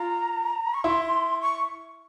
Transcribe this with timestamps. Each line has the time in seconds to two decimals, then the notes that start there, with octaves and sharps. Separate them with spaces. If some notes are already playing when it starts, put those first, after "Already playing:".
Already playing: F4 A#5
0.74 C#6
0.84 E4 C6
1.42 C#6